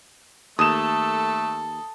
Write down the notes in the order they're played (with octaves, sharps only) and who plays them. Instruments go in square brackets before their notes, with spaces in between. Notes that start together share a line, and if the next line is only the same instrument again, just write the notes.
[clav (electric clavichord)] D#2 [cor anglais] A3 [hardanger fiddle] A4 [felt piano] D#6 E7